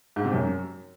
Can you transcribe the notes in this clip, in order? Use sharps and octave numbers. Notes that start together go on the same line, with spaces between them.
G#2
C3
F#2